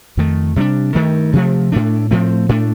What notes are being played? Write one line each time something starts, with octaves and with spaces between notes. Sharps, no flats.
F2 D#3 A3
C3 G3 A#3 D4
G2 D#3 A3
C3 F3 A3
A2 A3 D4
A2 F3 A3 C4
A2 A3 D4